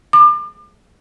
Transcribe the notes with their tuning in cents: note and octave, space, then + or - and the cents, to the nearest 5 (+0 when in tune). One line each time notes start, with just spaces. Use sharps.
D6 +35